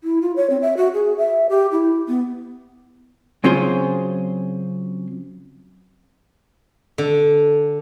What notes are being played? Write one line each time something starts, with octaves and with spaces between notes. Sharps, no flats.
E4
F4
C#5
C4
E5
F#4
G#4
E5
G4
E4
B3
C#3 F#3 C4 F4 G#4 C5
D3